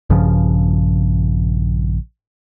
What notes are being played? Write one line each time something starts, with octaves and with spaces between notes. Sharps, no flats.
A#1 G2 C#3 F3